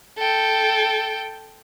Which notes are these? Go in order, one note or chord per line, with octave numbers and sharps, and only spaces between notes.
A4 G5